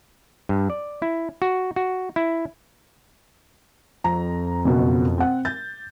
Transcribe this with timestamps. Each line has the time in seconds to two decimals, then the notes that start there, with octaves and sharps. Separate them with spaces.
0.49 G2
0.70 D5
1.02 E4
1.42 F#4
1.76 F#4
2.16 E4
4.04 F2 A#5
4.65 F#1 B2 F#4
5.18 C4 F#5
5.45 G6 A6